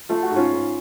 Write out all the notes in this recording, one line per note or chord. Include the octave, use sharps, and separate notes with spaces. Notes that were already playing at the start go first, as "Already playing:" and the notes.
A3 F4
F#4
G#2
C#4 F4
G#2